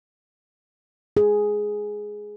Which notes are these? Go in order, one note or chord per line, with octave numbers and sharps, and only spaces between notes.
G#4